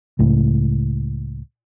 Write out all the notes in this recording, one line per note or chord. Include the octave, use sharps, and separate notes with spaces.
C#2 A2